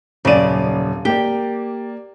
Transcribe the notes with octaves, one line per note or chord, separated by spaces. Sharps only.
D#1 F#2 C#3 D5 D#7
A#3 G4 D5